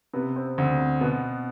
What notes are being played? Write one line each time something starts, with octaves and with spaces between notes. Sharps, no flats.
C3 B3
C4
D2 C4
C4
B2 B3